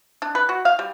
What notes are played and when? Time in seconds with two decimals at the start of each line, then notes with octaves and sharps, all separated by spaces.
0.22 D4
0.35 B4
0.49 F#4
0.65 F5
0.79 G3